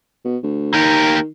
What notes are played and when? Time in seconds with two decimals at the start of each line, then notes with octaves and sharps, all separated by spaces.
0.25 B2
0.43 D2
0.74 D#3 A#3 G4 A#4